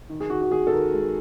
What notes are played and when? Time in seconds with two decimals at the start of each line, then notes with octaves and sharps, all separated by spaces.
0.10 D#3
0.21 G#4
0.30 D#3 F#4
0.41 F#4
0.51 D#3 G#4
0.67 A4
0.72 D#3 A#4
0.93 G#3